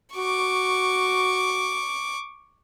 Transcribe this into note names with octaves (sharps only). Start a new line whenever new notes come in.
F#4 C#6 D6